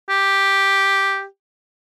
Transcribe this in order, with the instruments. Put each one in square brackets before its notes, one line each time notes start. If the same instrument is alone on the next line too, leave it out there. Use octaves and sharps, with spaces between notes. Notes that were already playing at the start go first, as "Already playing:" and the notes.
[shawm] G4